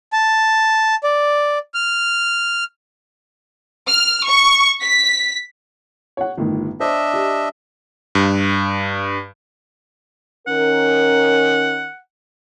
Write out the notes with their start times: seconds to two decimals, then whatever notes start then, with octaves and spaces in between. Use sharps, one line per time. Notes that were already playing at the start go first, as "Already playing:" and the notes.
0.13 A5
1.04 D5
1.74 F6
3.89 F6
4.28 C#6
4.84 B6
6.17 C#5 F#5
6.37 G1 A2 D#3
6.80 D4 C5 D#5 E5
7.13 G4
8.15 G2
10.47 D#3 C#4 A#4 F#5